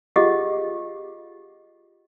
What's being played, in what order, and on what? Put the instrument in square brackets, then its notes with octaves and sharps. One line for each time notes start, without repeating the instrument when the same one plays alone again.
[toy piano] F4 G4 G#4 D#5 F5 F#5